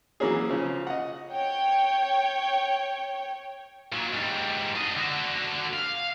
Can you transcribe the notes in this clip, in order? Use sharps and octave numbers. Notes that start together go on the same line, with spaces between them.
E3 F#3 A#3 C#4 G#4
C#3 F3
D#5 F#5
C#5 G5
A#2 F#3
G#2 G3
D4 D#5
D3 F#4
F5